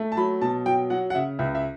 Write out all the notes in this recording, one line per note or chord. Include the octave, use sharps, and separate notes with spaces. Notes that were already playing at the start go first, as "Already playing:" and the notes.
Already playing: A3
A5
F#3 B5
B2 A5
F#3 G5
F#3 F#5
F#5
C#3 E5
C#2 E5
E5